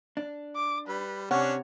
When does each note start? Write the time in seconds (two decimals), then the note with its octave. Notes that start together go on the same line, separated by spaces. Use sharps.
0.17 D4
0.56 D6
0.88 G3 B4
1.31 C3 C#4 D4 C#5 F#5